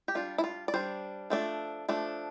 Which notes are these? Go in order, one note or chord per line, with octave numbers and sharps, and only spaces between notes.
G4
G3 D4 F4
E4
F4
D5
G3 D4 C5
F3 A3 D4
F3 A3 D4